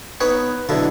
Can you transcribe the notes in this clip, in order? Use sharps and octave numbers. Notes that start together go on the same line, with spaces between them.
B3 D#4 B4 C#5 F#5
B2 D3 F#3 E4